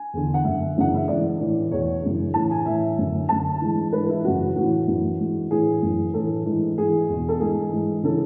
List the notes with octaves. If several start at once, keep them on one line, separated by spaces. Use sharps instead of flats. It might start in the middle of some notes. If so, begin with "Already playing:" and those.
Already playing: G#5
E2 D3
F#5
F#2 D3 E5
F#2 C#3 E3 F#5
E5
G#2 E3 D5
A2 E3
E2 B2 C#5
F#2 C#3 E3
A2 E3 A5
G#5
A2 E3 E5
F#2 D3
F#2 D3 A5
G#2 E3
G#2 E3 B4
E4
F#2 C#3 E3 F#4
A2 E3 F#4
F#2 E3
G#2 E3
A2 E3 G#4
F#2 E3
A2 E3 A4
G#2 E3
G#2 E3 G#4
E2 B2
A4
G#2 E3 G#4
G#2 E3
C#3 E3 A4